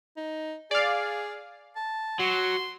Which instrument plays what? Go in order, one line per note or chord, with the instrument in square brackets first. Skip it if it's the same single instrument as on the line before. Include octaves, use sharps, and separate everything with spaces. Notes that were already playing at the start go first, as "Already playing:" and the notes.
[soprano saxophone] D#4
[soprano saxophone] G#4 [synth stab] D5 F5
[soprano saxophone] A5
[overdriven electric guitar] F#3 [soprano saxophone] C6